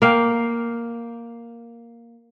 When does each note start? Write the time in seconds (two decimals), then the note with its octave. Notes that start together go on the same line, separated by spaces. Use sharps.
0.02 A#3 F5 G5